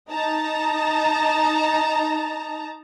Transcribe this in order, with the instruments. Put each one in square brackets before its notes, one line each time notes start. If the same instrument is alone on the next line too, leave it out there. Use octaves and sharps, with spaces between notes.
[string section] D#4 A5 A#5